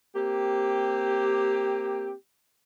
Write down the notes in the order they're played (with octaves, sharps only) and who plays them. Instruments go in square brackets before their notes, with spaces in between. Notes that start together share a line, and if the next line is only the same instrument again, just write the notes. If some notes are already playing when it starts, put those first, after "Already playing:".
[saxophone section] A#3 C4 G4